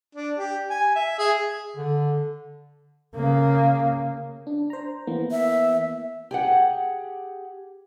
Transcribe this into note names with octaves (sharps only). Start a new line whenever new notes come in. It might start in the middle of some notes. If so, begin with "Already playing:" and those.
D4
G4
G#5
E5
G#4
D3
C#3 A#3
D4
C5 A#5
E3 A#3 B3
E5
G4 G#4 F#5